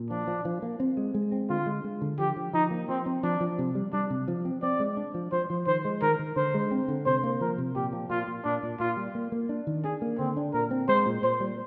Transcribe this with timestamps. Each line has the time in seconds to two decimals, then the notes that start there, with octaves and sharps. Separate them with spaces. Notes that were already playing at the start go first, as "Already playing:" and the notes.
Already playing: A#2
0.10 F3 D4
0.27 F3
0.45 F3
0.62 A#3
0.80 C4
0.97 G#3
1.14 G#3
1.32 C4
1.50 D3 F4
1.66 G#3
1.84 G#3
2.02 D3
2.19 F3 G4
2.36 F3
2.53 F3 D#4
2.71 A#3
2.89 F3 C4
3.06 C4
3.23 F3 D4
3.40 F3
3.59 C3
3.75 G3
3.93 G3 D4
4.10 C3
4.28 F3
4.45 C4
4.62 C4 D5
4.80 G#3
4.97 D4
5.14 F3
5.32 F3 C5
5.50 F3
5.67 D#3 C5
5.85 G#3
6.02 D#3 A#4
6.19 D#3
6.36 D3 C5
6.54 G#3
6.71 C4
6.88 D3
7.06 C3 C5
7.23 A#3
7.41 F3 A#4
7.58 C3
7.75 A#2 G4
7.93 F3
8.10 A#2 F4
8.28 A#2
8.45 A#2 D4
8.63 A#2
8.80 A#2 F4
8.97 G3
9.15 A#3
9.32 A#3
9.49 D4
9.67 D#3
9.84 D4 G#4
10.02 A#3
10.18 D3 C4
10.37 D4
10.54 A#2 A#4
10.71 C4
10.88 G#3 C5
11.06 A#2
11.23 A#2 C5
11.40 G3